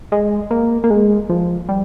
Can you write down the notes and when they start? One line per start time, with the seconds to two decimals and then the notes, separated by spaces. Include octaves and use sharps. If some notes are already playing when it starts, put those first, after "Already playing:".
0.12 G#3
0.51 A#3
0.84 A#3
0.90 G#3
1.29 F3
1.69 G3